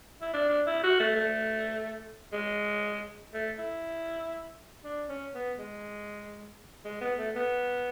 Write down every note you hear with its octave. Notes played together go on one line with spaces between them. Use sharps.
E4
D4
D4
E4
F#4
A3
A3
G#3
A3
E4
D4
C#4
B3
G#3
G#3
B3
A3
B3